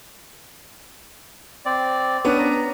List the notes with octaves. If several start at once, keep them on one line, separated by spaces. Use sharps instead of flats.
C4 D5
B3 C#4 D4
A#5